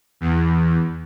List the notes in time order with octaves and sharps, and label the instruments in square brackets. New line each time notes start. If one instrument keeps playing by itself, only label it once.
[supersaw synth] E2